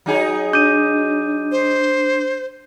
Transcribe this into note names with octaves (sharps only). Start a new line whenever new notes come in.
F#3 D#4 G#4
D4 G6 D#7
C5